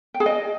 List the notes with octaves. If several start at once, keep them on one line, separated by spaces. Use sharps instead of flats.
G5
G#4
D#5